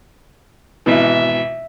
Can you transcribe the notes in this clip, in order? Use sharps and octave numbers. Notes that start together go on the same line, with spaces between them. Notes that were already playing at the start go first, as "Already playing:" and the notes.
G#1 B2 E3 E5